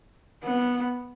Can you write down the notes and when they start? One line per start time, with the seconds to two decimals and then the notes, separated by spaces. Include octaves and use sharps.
0.44 B3